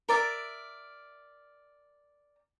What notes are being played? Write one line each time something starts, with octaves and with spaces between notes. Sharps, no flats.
A#4 D5 E5